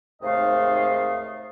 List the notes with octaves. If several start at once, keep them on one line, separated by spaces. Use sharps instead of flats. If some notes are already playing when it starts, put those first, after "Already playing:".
D#2 G#2 C3 A3 D#5 F5